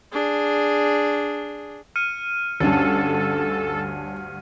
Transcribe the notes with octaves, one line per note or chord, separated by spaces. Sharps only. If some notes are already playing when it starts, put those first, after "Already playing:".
D4 G#4
F6 C#7 D#7
D2 G2 C#4 D4 A4